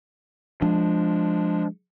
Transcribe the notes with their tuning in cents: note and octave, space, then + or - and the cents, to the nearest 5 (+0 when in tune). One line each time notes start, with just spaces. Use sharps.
F3 +0 G#3 +0 D4 +0